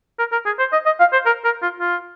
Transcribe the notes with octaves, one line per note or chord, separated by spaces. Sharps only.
A#4
A#4
G#4
C5
D#5
D#5
F5
C5
A#4
A#4
F4
F4